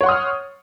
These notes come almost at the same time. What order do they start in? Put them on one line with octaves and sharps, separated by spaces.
C#5 F#5 C6 D#6 F6